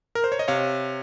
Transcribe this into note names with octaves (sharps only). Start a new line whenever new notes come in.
A#4
C5
C#5
D#5
C3 C#5 F5